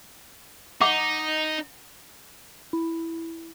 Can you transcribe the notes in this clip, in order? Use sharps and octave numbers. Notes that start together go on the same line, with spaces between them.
D#4 F#5 D6
E4